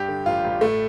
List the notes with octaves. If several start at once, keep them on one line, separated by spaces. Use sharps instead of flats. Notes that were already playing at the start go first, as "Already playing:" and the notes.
Already playing: G2 G4
D3
A1 F4
A1
A2 A3